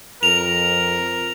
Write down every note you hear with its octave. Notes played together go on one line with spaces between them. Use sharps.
F2 A#4 F7